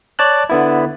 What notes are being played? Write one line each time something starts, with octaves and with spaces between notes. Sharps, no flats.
C#5 D5 A5 F#6
D3 B3 E4